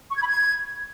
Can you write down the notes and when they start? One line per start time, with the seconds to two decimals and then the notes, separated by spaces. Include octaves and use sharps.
0.11 C#6
0.16 G#6
0.22 B5
0.27 G#6